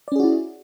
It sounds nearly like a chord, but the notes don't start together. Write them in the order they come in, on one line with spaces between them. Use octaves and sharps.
D5 C#4 G#4 F#4 E4